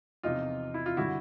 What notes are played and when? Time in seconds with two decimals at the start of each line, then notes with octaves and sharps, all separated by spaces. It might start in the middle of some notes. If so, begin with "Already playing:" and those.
0.23 E2 C3 F3 D#4 F4
0.74 E4
0.86 F4
0.97 D3 G3 E4 F#4